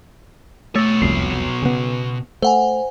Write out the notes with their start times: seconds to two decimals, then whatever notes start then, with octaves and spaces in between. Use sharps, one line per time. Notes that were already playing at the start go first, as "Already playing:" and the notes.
0.76 B2 A3 C#5
1.02 E1 C2 F2 C7
1.62 C#3 B3
2.42 A3 C5 F#5 G#5